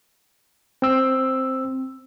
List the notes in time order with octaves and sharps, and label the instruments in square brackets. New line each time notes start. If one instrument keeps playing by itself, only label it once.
[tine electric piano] C4 E6